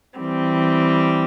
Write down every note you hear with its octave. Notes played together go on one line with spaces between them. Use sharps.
E3 G3 C4